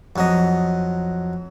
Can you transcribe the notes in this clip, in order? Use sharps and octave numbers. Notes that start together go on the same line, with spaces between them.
F2 F#3 D#5